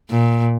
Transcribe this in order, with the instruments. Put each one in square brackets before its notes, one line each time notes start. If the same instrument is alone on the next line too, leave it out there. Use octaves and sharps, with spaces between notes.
[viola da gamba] A#2